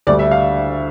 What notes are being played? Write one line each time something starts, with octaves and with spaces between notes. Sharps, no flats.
D2 D3 G3 D5
E5
F5